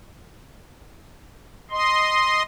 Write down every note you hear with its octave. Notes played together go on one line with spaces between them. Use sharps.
D#5 C6